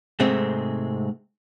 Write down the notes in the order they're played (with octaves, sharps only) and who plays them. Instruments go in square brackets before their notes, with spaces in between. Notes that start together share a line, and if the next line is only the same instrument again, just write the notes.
[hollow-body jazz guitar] G#2 C3 G#3 A3 C4